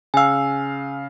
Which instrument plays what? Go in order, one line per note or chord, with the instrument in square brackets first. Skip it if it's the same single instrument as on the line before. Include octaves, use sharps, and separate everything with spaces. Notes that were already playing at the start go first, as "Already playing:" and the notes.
[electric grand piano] C#3 F5 [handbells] G#5 E6